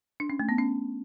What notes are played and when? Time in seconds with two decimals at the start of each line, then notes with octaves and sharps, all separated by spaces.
0.20 D4
0.30 C#4
0.40 A3
0.49 B3
0.58 C#4